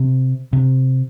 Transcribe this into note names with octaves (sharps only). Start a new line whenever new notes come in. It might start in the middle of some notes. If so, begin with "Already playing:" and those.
Already playing: C3
C3